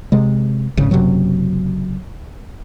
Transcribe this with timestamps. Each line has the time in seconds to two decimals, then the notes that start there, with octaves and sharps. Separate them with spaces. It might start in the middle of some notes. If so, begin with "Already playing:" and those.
0.12 C3 G#3
0.77 G#1 C#3
0.91 F#1 F#2 C3 F#3